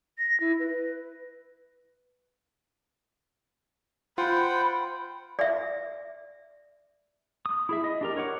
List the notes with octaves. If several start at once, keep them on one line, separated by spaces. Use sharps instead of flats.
A#6
E4
B4
F4 C5 F#5 G5 B5
D5 E5
D#6
E4 G#4 E5
D#5
D4 G4 A#4
A#4 C#5 F#5 D6